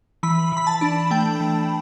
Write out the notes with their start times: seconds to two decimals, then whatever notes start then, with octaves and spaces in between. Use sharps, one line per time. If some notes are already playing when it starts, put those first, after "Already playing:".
0.23 E3 B5
0.52 E3 B5
0.67 A5
0.81 D4
1.11 A3 G5
1.40 E3